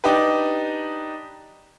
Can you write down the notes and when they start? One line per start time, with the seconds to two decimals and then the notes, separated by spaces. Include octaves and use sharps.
0.04 D4 D#4 G4 B4